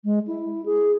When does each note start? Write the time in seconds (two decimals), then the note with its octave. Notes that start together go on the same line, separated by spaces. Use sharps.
0.04 G#3
0.27 E4
0.66 G#4